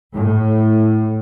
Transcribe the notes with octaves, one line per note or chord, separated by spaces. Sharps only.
A2